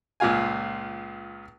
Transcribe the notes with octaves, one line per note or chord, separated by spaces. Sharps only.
C#2 A#2 F4 F5 G#5